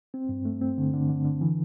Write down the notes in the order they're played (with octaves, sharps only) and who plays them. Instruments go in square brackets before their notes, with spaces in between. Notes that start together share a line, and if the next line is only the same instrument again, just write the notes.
[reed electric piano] C4
G2
A3
C4
D3
D3
D3
D3
E3